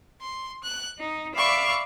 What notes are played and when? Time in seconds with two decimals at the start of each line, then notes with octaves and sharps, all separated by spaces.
0.19 C6
0.62 F#6
0.99 D#4
1.35 D5 E5 F5 B5 C#6 D6